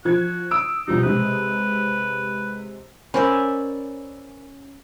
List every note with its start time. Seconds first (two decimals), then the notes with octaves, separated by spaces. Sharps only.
0.05 F3 F#4 G#6
0.51 D#6 E6 D7
0.88 B2 F3 G3 D#4
1.03 C3 G#3 B4
3.14 C#4 A#4 C5 D5 E5 B5